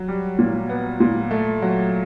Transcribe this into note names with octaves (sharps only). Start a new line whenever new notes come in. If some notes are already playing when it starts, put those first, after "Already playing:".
Already playing: F#3
G3
A#2
B3
A#2
A3
F#3